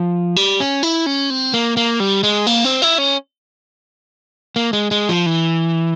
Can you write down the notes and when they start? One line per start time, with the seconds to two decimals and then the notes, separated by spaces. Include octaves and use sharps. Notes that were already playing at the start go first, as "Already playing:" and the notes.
Already playing: F3
0.36 G3
0.60 C#4
0.83 E4
1.06 C#4
1.30 C4
1.54 A#3
1.77 A#3
2.00 G3
2.23 G#3
2.47 A#3
2.64 C4
2.82 E4
2.98 C#4
4.56 A#3
4.73 G#3
4.91 G#3
5.09 F3
5.26 E3